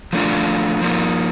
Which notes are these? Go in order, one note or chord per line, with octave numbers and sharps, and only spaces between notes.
F3 A3 D4 F4
F3 A#3 D#4